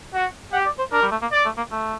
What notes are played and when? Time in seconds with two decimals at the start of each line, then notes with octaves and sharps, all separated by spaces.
0.14 F#4
0.52 G4 F#5
0.66 D5
0.79 C5
0.92 D4 A#4
1.02 G3
1.12 A3
1.22 A#3
1.32 D5
1.45 A3
1.58 A#3
1.72 A3